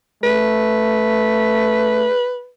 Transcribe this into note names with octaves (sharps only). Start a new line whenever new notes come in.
A3 B4